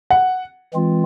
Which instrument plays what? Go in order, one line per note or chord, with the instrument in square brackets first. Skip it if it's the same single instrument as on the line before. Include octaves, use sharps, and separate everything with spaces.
[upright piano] F#5
[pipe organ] E3 G#3 C4 F4